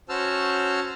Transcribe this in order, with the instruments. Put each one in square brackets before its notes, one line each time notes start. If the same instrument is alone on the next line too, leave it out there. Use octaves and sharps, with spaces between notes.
[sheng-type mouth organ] C#4 F#4 C5 A5 E6 F6